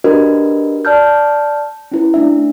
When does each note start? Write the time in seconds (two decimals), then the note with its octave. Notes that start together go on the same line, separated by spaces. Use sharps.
0.04 D4 F#4 G4 A#4 B4 D#5
0.85 D5 A5 F6 G6
1.92 C#4 E4 B4
2.14 A3 D4 E5